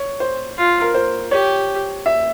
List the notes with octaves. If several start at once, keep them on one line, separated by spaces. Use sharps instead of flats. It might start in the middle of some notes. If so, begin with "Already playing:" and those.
Already playing: C#5
C5
F4
A#4
C5
G4 C#5
E5